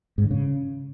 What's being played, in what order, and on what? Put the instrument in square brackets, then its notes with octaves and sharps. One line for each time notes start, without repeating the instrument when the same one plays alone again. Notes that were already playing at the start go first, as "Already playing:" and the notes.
[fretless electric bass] G#2
D3
C#3